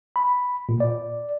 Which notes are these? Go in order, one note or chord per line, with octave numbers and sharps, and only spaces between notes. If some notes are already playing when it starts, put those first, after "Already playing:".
B5
A#2
D5